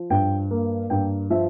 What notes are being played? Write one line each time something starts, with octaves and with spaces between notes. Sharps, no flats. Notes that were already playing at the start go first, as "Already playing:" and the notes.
Already playing: F3
G2 G5
A#3
G2 G5
F3 E5